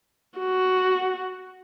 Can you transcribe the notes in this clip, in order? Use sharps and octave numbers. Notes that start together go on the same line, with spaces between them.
F#4